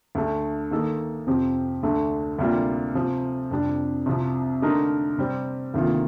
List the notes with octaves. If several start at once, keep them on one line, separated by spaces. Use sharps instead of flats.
D2 D3 A3
D#3 A#3 D#4 A4
F2 C3 F3 C4 G4
D2 D3 A3
D2 C3 G3 A#3 F4
C3 F3 C4
F2 C3 G3 D4
C2 C3 F3
D3 A3 D#4 A#4
C3 G3 C4
D2 C3 D#3 A#3 F4